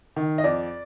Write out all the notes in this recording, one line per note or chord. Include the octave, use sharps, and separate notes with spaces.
D#3
D#5
F2 D5